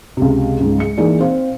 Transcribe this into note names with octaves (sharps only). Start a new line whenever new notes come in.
C#2 C3
C#2 G#2
G#3 C#7
E3 A#3 D#4 G#4 D5
C4 C5 F5